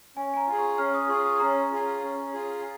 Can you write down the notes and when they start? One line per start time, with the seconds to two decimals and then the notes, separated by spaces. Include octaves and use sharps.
0.16 C#4 G#5
0.34 G#5
0.37 A#5
0.47 F4
0.52 G#4
0.58 C#6
0.78 C#4 F6
0.94 D#6
1.09 F4 G#4 C#6
1.25 D#6
1.40 C#4 A#5
1.72 F4 G#4
2.03 C#4
2.33 F4 G#4